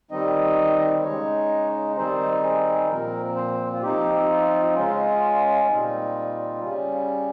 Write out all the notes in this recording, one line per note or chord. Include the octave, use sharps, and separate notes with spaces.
D#3 G3 C4 D#4 D#5
C#3 G#3 D#4 C#5
D#3 G3 C4 D#4 C5
G#4
A#2 F3 C4 A#4
C5
F4
F3 C4 D#4 G4
F4
C#3 G#3 C#4 F4
A#2 G3 C4 D#4
C#3 G3 C#4